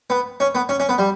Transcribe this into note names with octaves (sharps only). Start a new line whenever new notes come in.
B3
C#4
B3
C#4
C#4
B3
G3